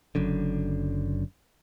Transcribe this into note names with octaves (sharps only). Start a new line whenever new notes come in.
F#1 F#2 D3